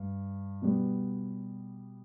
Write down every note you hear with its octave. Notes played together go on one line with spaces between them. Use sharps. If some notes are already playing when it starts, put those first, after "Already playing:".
Already playing: G2
B2 G3 B3